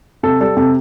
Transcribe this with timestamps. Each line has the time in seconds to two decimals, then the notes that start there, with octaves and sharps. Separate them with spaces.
0.23 C3 A4
0.40 G3 A4
0.57 C3 A4